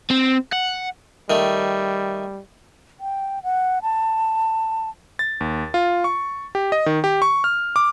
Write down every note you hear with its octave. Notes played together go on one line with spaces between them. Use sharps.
C4
F#5
D#3 G3 A3
G5
F#5
A5
A6
D#2
F4
C#6
G4
D#5
D#3
G4
C#6
F6
D6